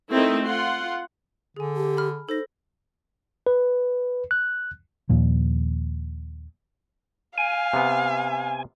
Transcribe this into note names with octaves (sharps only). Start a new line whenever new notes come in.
A3 C4 D#4 E4 A#4
F4 F#5 C6
D3 G#4 G#5
G4 A5
B5 F6
D#4 A4 C5 A#6
B4
F#6
D#2 A#2 F3
F5 G#5
C3 B3